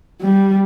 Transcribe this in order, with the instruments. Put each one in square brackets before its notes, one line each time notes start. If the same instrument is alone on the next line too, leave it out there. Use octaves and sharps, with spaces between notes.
[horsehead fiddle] G3